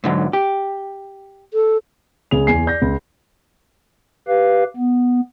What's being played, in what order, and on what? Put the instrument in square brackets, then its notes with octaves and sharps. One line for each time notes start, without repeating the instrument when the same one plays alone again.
[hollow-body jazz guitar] G#2 D3 F#3
G4
[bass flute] A4
[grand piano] C#2 C#3 G#4 F7
E2 G#5 C7
D5 G6 A#6
C#2
[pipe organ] G4 B4 F5
B3